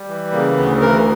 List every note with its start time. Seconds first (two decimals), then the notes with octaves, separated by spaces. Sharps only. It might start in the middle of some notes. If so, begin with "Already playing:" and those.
Already playing: G3
0.08 E3
0.32 C#3 A#3
0.57 D2 B3
0.80 E3 A#4